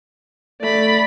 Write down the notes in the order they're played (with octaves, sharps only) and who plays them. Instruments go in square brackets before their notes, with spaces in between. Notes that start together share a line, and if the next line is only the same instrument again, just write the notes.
[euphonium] A3 [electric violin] D5 B5